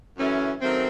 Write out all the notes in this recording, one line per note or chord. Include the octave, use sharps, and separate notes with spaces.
F#2 E3 A3 C#4 F#4
D#3 F#3 A3 C4